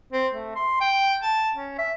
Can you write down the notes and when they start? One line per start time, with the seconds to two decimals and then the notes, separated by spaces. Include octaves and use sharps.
0.13 C4
0.33 A3
0.56 C6
0.81 G5
1.23 A5
1.55 C#4
1.79 E5